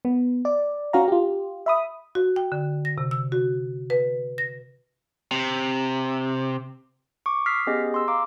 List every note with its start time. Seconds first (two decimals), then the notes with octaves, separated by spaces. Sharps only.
0.05 B3
0.45 D5
0.93 C#4 F#4 F5 A#5
1.08 F4 G4
1.66 E5 B5 D#6
2.15 F#4
2.36 G5
2.52 D3
2.85 A#6
2.98 C3
3.11 E6
3.32 F#4
3.90 B4
4.38 A#6
5.31 C3
7.26 C#6 D6
7.46 D#6 F6 B6 C7
7.67 B3 C#4 G4 G#4 D#5
7.94 C6 E6
8.08 F5 A#5 D6